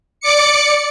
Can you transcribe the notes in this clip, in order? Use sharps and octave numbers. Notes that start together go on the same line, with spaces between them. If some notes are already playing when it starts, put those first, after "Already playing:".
D5 D6 C#7